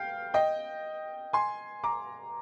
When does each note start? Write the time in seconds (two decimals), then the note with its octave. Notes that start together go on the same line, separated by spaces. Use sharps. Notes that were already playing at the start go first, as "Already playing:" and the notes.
Already playing: F5 G5
0.34 D#5 G5
1.33 G#5 C6
1.84 A#5 D6